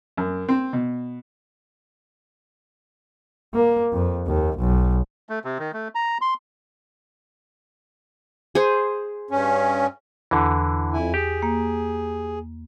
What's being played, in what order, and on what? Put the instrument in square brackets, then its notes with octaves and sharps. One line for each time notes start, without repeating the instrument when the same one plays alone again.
[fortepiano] F#2
C4
B2
[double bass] A#3
F2
D#2
B1
[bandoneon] A3
C3
D#3
A3
A#5
C6
[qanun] G#4 C5
[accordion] G2 C#4
[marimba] E2 [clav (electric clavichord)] D3 E3
[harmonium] F2 E4 G#5
[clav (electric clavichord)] G4 [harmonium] G#4
[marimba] A#3